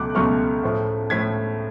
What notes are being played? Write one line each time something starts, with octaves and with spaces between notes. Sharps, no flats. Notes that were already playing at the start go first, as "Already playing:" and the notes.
Already playing: C#2 B2 F#3 A3 D6 F#6
C#2 B2 F#3 A3 C#6 F6
A2 F3 A3
A2 F3 A3 G#6 B6